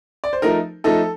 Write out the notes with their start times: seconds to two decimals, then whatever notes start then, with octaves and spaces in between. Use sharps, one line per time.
0.24 D5
0.33 C5
0.42 F3 A3 D#4 A#4
0.84 F3 A3 D#4 A4